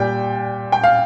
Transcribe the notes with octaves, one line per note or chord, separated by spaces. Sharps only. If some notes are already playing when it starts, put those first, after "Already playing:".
Already playing: A#2 G3 G5
G5
F5